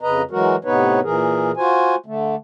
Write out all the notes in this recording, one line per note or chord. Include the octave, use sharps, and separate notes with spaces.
F2 C#3 B4 D#5 A#5
E3 F#3 G#3 F#4 A#4
A2 C3 B3 D#4 B4 C#5
A#2 E3 G#4 A#4
F4 F#4 C5 G#5
D3 A3